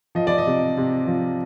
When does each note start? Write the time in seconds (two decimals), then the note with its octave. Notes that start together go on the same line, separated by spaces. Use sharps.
0.15 F3 D#5
0.27 D5
0.38 D#5
0.47 C3
0.77 C3
1.07 F3